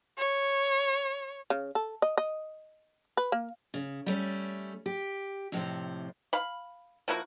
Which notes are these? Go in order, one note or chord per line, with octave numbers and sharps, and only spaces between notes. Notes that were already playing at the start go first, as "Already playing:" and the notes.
C#5
C#3
A4
D#5
D#5
B4
A#3
C#3
G3 A3 C#4
G4
F2 A2 C3 C5
F5 B5
F3 A#3 E4 F#4